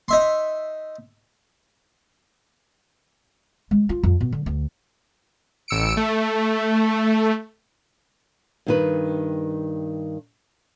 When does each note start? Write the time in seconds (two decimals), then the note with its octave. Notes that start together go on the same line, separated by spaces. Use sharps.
0.08 D#4 E5 C6
3.71 G#3
3.89 F4
4.03 F2
4.20 B2
4.32 D3
4.46 D2
5.68 A1 E6 C#7 D7
5.97 A3
8.67 G2 D#3 B4